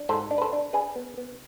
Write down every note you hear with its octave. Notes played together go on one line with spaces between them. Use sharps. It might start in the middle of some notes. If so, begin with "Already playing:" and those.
Already playing: D4
G#2 A4 C5
D4
B4
A4 C5
D4
D4 G#4 B4
B3
B3